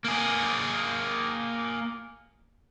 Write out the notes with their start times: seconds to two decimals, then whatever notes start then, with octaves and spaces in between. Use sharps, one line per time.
0.05 A#3 G#4